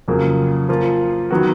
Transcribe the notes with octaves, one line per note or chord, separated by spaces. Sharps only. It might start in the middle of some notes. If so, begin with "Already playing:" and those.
F2 C#3 F#3 A#3 F4
F3 A#3 F4
D#3 F#3 B3 F#4